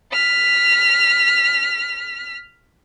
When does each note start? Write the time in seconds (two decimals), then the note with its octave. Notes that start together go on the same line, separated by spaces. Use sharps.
0.13 F6 B6